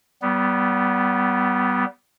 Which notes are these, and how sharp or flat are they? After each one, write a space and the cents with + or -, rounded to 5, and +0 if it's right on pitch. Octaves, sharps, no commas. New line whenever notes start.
G3 -25 B3 +0